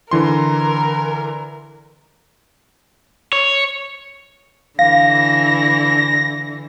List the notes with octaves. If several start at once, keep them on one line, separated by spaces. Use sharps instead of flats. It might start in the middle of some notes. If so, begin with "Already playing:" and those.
D3 E3 A#4 C6
C#5
D3 E3 F5 A#6